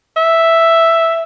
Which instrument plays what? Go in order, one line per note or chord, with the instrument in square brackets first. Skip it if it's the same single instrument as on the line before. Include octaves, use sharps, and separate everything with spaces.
[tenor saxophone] E5